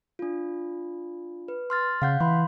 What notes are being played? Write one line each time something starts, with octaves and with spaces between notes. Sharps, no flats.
D4 F4
B4
C6 F6 A6
C#3 F5 F#5 G6
E3 B5 C6